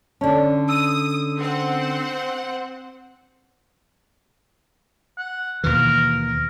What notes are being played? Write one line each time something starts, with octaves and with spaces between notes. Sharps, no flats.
D3 C#4 D5 A5
D#6 E6 D#7
C4 C5 F#5
F#5
D#2 B2 E3 A#4
A#4